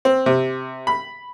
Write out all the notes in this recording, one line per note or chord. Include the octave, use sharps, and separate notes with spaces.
C4
C3
B5